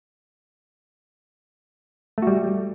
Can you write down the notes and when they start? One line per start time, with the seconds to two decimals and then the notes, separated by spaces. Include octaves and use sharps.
2.18 A3
2.22 F#4
2.27 G3